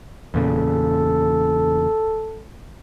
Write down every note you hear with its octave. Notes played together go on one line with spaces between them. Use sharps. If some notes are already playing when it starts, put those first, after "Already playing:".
E2 A#2 C#3 A4